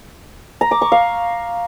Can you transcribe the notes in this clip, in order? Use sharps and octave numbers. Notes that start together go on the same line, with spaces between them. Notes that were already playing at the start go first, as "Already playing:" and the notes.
A#5
D6
C#6
F5